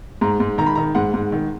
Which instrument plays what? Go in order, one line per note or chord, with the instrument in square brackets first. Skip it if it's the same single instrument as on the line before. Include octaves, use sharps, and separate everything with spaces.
[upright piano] G#2 A#5
G#2
D#3 A#5
B5
D#3 A#5
G#2 F#5
G#2
D#3